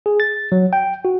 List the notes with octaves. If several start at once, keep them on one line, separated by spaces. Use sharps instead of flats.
G#4
A6
F#3
G5
F#4